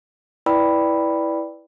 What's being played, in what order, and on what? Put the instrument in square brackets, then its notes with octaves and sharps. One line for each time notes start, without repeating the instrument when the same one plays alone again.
[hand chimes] E4 B4 D5 G5 B5 E6